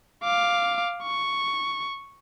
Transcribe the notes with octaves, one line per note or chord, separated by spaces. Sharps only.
F5 D6
C#6